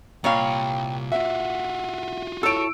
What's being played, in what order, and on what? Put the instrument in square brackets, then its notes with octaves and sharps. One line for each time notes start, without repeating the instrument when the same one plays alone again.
[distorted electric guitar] C2 B5 [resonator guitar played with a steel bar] A#2 C#5 F5 [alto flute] G5
[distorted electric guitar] F4 F#4 [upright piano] E5 [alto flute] F#5
[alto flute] E4 [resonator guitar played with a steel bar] A4 C#5 [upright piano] E6 D7